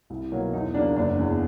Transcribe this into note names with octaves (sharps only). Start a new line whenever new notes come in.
C2
B2 F#3 A#3
E2 D#4
C#3 F#3 A#3 D4
F#1 D4
E2 C#3